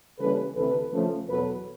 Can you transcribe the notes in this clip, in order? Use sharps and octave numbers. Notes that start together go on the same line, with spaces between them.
C#3 E3 G3 A#3 C#4 A4 B4
D2 C3 E3 A4 B4
C#3 F3 A3
E2 B2 F#3 A4 B4